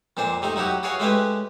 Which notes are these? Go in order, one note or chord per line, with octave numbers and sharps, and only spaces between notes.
F2 A#2 D4 C5
C3 A3 D#4
F#3 D#4 E4 F#4 G4
E4 F#4 G#4 C#5 F5
G#3 A3 C#4 E4 G4 B4